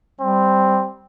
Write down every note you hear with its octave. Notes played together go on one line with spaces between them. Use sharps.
G3 C4